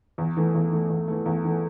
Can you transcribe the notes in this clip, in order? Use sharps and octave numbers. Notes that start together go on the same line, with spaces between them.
E2
E3 A3
E2
E3 A3
E2
E3 A3
E2
E3 A3